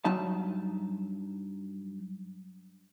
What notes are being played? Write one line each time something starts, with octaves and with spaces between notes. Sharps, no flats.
G2 F#3 D#4 A5